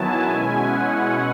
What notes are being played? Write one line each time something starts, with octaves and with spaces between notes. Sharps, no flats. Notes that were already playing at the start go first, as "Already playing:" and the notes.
Already playing: D#3 F#3 B3 E4 G#5 A5
B2 G#3 C#4 E4
F#5